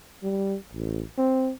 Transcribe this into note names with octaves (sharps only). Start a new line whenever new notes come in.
G3
A1
C4